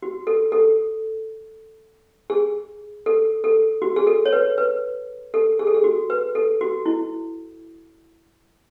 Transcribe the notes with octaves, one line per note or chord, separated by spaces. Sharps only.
F#4
A4
A4
G#4
A4
A4
F#4
G#4
A4
C#5
B4
B4
A4
G#4
A4
G#4
F#4
B4
A4
F#4
E4